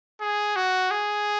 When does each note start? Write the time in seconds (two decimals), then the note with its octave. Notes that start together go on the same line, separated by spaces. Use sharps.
0.21 G#4
0.56 F#4
0.91 G#4